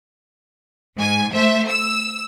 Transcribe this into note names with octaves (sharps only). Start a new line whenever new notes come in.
G#2 G#5
A3 C5 E5
E6